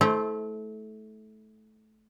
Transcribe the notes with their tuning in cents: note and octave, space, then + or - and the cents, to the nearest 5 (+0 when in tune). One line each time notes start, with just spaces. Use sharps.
A3 -20 E4 -35 C5 +0